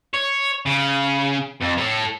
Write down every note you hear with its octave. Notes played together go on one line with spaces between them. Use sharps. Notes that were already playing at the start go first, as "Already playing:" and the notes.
C#5
C#3
F2
A2 A4